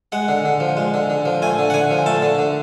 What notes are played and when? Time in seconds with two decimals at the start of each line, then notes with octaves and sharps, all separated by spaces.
0.12 G#3 F#5
0.28 D3
0.45 D3
0.60 F3
0.77 G#3
0.94 D3
1.10 D3
1.26 F3
1.42 A3 G#5
1.59 D3
1.70 F#5
1.74 D3 G#5
1.91 F3
2.06 A3 A5
2.22 D3
2.39 D3